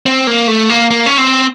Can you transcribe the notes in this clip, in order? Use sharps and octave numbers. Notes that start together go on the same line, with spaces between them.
C4
A#3
A3
A#3
A#3
C#4
C4